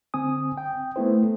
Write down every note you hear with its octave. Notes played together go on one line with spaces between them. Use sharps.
D3 C4 G#5 D#6
G5
A3 B3 E4 C5